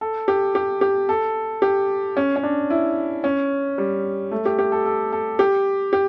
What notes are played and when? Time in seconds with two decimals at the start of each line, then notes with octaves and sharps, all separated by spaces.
0.01 A4
0.28 G4
0.55 G4
0.81 G4
1.09 A4
1.62 G4
2.17 C#4
2.36 C#4
2.43 D4
2.70 E4
3.24 C#4
3.78 G3
4.31 A3
4.46 G4
4.59 G4
4.72 A4
4.86 A4
5.12 A4
5.39 G4
5.93 G4